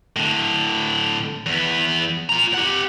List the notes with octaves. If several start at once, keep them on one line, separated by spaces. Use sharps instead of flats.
A2 D3
E2 B3
F4 A#5
G4 F#5